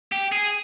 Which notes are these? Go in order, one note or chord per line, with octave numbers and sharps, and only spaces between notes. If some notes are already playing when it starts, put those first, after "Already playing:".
G4
G#4